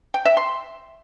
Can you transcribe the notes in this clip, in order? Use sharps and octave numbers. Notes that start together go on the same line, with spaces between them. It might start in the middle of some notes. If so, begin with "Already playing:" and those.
G5
E5
C6